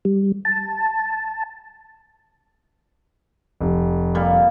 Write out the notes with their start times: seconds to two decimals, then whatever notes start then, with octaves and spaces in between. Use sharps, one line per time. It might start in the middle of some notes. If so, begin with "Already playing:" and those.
0.05 G3
0.45 A5
3.61 F1
4.15 A#2 G3